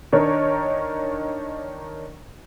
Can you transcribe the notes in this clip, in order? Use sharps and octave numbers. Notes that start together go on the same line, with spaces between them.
D#3 D4 D#4 A#4 C#5